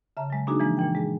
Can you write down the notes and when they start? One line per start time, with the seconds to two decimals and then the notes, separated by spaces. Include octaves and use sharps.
0.17 C#3 E5 A5 A#5
0.30 F#3 G#3
0.47 A#3 D4 D#4 F#4 G#4
0.60 E3 F3 G#3 A#3
0.77 A#2 E3 G5
0.95 G#3 G#4